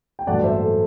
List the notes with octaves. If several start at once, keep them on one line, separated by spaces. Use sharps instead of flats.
G5
A1 G2 F#3 A3 D5 F#5
C5 E5
A4